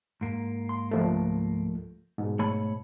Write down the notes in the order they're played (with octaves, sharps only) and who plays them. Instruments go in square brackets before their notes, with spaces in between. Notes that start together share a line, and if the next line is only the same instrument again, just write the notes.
[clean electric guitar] G#2 A#3
[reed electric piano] C6
C#2 F3 A3
G#2 B2
[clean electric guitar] A3 C#5 B5